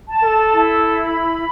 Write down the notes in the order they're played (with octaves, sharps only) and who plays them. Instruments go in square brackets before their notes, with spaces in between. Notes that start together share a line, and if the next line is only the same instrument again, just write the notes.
[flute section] A5
[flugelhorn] A4
[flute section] E4
B5